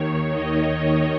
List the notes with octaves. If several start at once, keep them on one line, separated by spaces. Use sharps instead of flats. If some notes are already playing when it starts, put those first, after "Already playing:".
Already playing: D#2 D#3 C#5
D#5